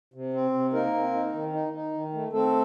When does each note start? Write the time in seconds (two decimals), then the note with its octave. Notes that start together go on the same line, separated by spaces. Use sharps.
0.14 C3
0.34 C4
0.54 C3
0.73 A#3 D#4 A#4
0.93 C4
1.13 D#4
1.33 D#3
1.53 D#4
1.73 D#4
1.93 D#3
2.13 A3
2.32 A3 C4 A4